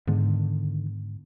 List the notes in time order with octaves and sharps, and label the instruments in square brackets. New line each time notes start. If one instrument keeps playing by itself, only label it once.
[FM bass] G#2 [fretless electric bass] D3 D#3 B3